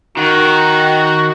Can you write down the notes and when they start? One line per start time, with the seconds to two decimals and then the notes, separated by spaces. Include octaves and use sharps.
0.17 D#3 F#4